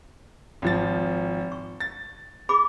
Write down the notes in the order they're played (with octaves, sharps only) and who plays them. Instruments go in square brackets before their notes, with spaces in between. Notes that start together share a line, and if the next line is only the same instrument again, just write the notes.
[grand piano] G#1 F3 A6
[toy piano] C#6
[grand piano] A6
[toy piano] G#4 B5 D6